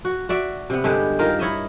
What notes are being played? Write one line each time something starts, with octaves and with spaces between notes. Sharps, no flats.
F#4
F#4 D5 E5
C3 B3
G2 D3 G#3 G4
D#3 F4 A#4
E4 C#5 D#5 E5